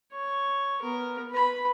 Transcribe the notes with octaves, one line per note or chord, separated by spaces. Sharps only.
C#5
B3 A#4
B4 B5